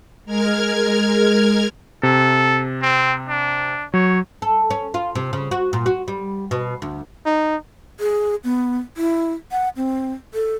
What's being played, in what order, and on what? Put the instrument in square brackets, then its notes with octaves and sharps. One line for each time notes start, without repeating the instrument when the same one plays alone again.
[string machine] G#3 A#4 F6 G#6
[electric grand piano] C3 [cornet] A4
[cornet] C4
D4
[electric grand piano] F#3 [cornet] C#5
[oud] A4
C#4
F4
C3
C#3
F#4
A#2
F#4
G3
B2
D2
[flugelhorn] D#4
[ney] G#4
B3
E4
F#5
C4
A4